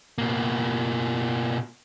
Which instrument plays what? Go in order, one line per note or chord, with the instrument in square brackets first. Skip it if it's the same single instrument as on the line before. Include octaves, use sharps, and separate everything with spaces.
[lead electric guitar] B2 A#3